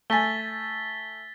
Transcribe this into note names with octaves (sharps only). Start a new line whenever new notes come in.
A3 G#5 A6 B6 G7